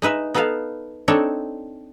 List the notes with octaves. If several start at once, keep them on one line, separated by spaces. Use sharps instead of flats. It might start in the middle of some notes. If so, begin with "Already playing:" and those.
G#3 D#4 B4 E5
B3 D#4 A4 B4 F5
C4 D4 D#4 A4 C#5